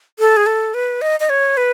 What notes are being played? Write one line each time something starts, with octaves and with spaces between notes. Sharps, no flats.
A4
G#4
A4
B4
D#5
D#5
C#5
B4